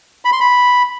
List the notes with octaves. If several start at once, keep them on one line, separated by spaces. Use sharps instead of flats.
B5
C6
B5